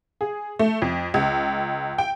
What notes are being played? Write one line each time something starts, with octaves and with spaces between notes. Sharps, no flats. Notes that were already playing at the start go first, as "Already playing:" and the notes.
G#4
A3
F2
C#2
G5